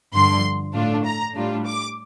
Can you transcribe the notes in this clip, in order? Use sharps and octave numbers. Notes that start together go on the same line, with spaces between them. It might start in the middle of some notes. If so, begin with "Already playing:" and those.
G2 D3 F3 C6
A2 A3 D4 F4
A#5
A2 G3 D4 F4
D6